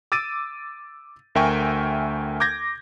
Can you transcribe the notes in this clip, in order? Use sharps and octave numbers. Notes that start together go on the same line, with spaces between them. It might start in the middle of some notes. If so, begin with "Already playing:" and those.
D6 E6 A6 D7 D#7
D2 A#4 E5 G5 G#5 C#6
D6 G6 G#6 A#6